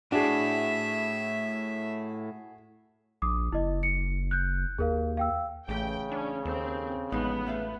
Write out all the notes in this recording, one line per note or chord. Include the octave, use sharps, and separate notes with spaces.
A2 D4 F#4 G#4 E5
A#1 D6 D#6
F#1 E4 D#5
C#7
F#6 G6
D#2 G#4 A#4 F5
F5 G5 E6
A1 C#3 E3 A3 G4 G5
C#4 D4
D#2 C4 A4
A1 F3 G#3 B3 D#4
A3 E5 F5